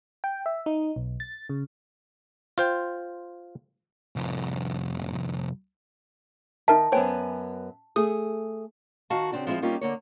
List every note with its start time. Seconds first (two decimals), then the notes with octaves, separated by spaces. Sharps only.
0.24 G5
0.46 E5
0.66 D#4
0.96 B1
1.20 A6
1.49 C#3
2.58 F4 C5 G5
4.16 C2 F2
6.68 D#3 D#4 A#4 E5 A5
6.92 F#2 B3 C5 C#5 G5 G#5
7.96 A3 G#4 D#6
9.10 D#3 F#4 F5 A5
9.32 C#3 C4 D4 F#4
9.47 F3 G#3 C4 E4 F4
9.62 G3 A#3 C#4 D#4 F4
9.81 D3 A#3 C#5